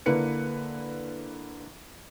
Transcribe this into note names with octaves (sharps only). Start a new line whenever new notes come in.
D3 A#3 E4 B4 C#7